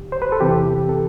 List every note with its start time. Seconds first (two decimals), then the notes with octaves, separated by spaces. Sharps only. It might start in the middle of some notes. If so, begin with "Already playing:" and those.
Already playing: F#2 D3 G4
0.12 C5
0.22 B4
0.32 A4
0.41 E2 C3 E3 G4
0.89 A4